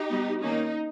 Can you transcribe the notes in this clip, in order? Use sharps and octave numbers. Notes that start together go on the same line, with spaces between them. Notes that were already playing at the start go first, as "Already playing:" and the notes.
Already playing: D#4 G4
G3 B3
D#3 A#3 C#4 D#4